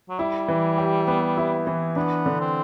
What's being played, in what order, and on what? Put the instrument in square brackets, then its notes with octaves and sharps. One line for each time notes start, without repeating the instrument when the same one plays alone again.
[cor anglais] F#3
[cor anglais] G3 [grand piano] E4
[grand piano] E3
G4
B3
E4
E3
[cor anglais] B3 [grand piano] D4
[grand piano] D3
[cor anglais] C4